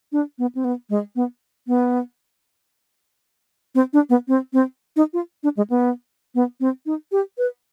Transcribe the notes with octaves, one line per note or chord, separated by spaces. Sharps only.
D4
B3
C4
B3
G#3
B3
B3
C4
D4
B3
C4
C4
D#4
F4
D4
G#3
B3
B3
C4
D#4
G4
B4